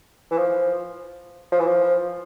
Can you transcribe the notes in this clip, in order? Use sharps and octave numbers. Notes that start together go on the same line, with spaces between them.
E3
F3
F3
E3
F3